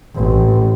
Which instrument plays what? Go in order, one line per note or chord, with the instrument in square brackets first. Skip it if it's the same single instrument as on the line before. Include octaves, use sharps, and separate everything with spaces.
[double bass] A1